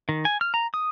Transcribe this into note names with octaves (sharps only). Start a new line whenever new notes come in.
D#3
G#5
F6
A#5
D#6